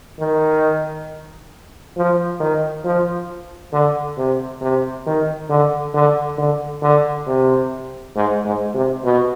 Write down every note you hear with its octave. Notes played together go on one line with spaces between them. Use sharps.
D#3
F3
D#3
F3
D3
C3
C3
D#3
D3
D3
D3
D3
C3
G#2
G#2
C3
B2